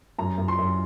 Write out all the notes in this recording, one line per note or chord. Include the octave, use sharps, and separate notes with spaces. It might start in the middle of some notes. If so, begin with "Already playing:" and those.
F#2 A#5
F#2
C6
F#2